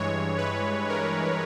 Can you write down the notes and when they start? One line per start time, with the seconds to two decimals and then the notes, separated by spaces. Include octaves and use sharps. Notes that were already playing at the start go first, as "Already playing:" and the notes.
Already playing: G2 E3 G#3 C#5
0.38 B4
0.89 A#4